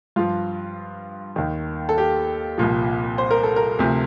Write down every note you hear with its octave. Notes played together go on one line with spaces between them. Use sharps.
G2 F3 F4
D#2 D#3
A4
G4
C2 A#2 F3
C5
A#4
A4
A#4
D2 C3 F3